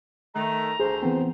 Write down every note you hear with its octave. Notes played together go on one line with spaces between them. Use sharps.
D#3 A3 A#5
D2 G#4 C5
E3 B3 C4